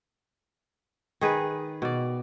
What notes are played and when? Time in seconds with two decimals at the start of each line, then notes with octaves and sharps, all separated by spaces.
1.21 D#3 G#4 B4
1.82 B2 D5